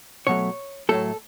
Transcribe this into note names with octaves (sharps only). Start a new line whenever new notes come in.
B2 F#3 A3 C#5
A2 F#3 A3 A4